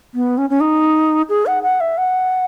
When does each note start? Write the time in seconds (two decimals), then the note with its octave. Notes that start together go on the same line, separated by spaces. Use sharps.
0.14 B3
0.38 C#4
0.50 C#4
0.61 D#4
1.29 G#4
1.46 F#5
1.63 F#5
1.81 E5
1.98 F#5